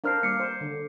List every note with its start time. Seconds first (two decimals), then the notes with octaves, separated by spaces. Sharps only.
0.04 D4 A#4 C5 F5 F6 C7
0.23 G3 A#3 D6 C7 C#7
0.40 C5
0.61 D3